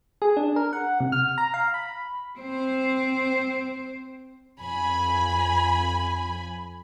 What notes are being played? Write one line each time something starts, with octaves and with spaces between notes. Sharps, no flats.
G#4
D4
A#4
F#5
C3
F6
A#5
F5
B5
C4 C5
F2 G#5 B5